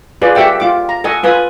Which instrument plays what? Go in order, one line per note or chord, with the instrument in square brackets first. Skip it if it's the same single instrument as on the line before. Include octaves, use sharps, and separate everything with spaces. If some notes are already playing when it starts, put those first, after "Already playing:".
[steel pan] F4 G#4 B4 D5
G4 A4 E5 F#5 G5
F4 D6
A#5
A4 D#5 F#5 G#5
F4 B4 G#5 D#6